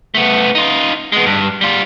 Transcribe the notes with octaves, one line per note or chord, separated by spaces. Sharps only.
A3 B3
D#4 F4
G#3 B3
G2
G3 F4